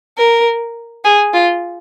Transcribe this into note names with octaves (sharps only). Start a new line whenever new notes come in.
A#4
G#4
F4